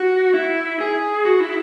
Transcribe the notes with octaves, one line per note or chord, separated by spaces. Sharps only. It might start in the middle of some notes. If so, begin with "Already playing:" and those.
Already playing: F#4
E4
G#4
F#4
E4